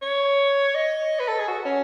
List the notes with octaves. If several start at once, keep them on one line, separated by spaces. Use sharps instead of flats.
C#5
D#5
B4
A4
G#4
F#4
C#4